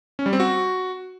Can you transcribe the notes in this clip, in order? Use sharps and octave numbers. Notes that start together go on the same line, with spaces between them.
C#4
G3
C4
F#4